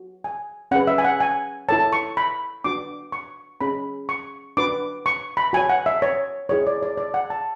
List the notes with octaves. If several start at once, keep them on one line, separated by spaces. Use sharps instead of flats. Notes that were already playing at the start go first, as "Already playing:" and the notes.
Already playing: F#4
G#5
C#4 G#4 B4 F#5
E5
G#5
F#5
G#5
E4 A4 C#5 A5
C#6
B5
D4 F#4 B4 D6
C#6
C#4 G#4 C#5 B5
C#6
D4 F#4 B4 D6
C#6
B5
F#4 C#5 G#5
F#5
E5
C#5
E4 G#4 C#5
D5
D5
D5
F#5
A5